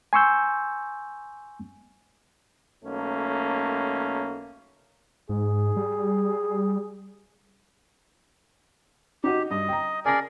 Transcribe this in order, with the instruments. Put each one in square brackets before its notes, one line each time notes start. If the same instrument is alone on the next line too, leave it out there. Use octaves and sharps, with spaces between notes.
[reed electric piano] G#5 C6 C#6 E6 G6
[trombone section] B1 A3 A#3 C#4
[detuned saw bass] G#2 [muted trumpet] G#4
[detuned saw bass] G3
[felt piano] D#4 F#4 D#5 [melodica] G4
[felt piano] G2 [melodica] D#5
[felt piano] G5 A#5
[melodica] G#4 A#4 D5 [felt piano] G#5 A5 A#6